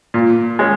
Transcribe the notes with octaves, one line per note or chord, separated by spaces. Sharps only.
A#2
G#3 C#4